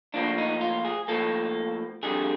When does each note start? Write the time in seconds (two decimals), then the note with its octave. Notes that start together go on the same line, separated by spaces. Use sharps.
0.14 A2 F3 A#3 D4
0.38 D#4
0.61 F4
0.85 G#4
1.08 A2 F3 A#3 A4
2.03 F2 D3 G3 G#4